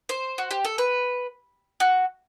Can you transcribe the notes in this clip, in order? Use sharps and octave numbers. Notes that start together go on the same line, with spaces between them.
C5
F#4
G4
A4
B4
F#4